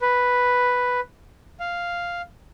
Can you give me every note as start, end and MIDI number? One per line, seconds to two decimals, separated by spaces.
0.01 1.00 71
1.60 2.22 77